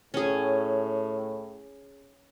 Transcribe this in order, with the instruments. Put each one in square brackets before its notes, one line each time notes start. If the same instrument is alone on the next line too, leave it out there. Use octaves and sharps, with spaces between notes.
[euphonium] A2 [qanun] C#4 G#4